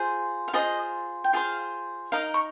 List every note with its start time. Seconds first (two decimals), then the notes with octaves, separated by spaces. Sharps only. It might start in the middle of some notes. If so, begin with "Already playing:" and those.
Already playing: F4 G#4 C5
0.48 F5
0.53 F4 G#4 C5 D#5
1.24 G5
1.33 F4 G#4 C5 F5
2.12 D#4 A#4 D#5 F5
2.34 C#6